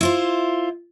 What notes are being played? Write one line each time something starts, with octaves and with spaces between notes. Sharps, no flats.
E4 F4 C5